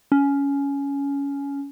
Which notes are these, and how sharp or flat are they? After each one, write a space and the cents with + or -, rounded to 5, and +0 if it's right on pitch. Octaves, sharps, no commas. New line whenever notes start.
C#4 +15